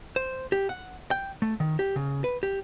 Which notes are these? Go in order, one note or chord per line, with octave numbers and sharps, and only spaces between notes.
C5
G4
F#5
G5
A3
D#3
G4
C#3
B4
G4